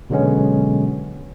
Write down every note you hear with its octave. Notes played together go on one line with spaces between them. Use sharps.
B2 D3 F#3 G#3 B3 C#4